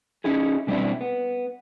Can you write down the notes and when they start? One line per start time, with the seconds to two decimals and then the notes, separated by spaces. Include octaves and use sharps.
0.24 C#4 D#4 E4 G#4
0.67 B2 G3 C4 D4 E4
1.01 B3